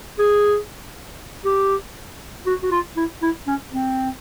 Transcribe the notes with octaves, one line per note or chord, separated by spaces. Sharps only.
G#4
G4
F#4
F#4
F4
E4
E4
C#4
C4